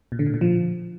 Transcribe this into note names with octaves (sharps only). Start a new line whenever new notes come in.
A#2
D3
A2
A#2
F3